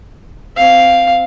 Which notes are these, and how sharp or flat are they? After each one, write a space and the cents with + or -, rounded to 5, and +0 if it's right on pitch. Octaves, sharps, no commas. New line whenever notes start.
C4 +0 F5 +0